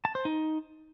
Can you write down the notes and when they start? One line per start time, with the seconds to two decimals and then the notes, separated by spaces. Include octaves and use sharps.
0.05 A5
0.15 C5
0.25 D#4